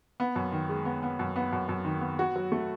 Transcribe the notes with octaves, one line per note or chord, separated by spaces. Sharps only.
B3
F#2
D#3
G#3
B3
B3
F#2
B3
F#2
F#2
D#3
B3
F#4
F#3
A3